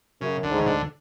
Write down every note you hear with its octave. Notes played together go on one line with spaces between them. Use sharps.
F#2 C#3
D2 D3
G#2
C#3
D2 D3